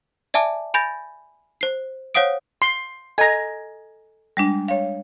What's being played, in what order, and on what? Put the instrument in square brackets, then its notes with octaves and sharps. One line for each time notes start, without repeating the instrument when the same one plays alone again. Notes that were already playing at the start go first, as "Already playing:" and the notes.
[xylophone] D5 E5 G#5 A5 D6
G#5 B5 G6 A6 A#6
C5 C7
C5 C#5 F5 F#5 D#6 D7
[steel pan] C6
[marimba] A4 D#5 [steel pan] G#5 A#5
[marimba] G3 G#3 D4
C#5 F5